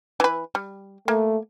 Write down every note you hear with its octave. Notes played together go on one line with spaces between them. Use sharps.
E3 B4
G3
A3 A#3